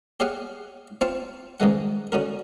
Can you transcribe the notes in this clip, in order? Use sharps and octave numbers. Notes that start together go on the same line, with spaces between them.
G4 G#4 C#5 F5 F#5 G#5
C4 F4 C5 A5 C#6
C#2 G#2 D#3 G#3 F#5
D3 C#4 F#4 A#4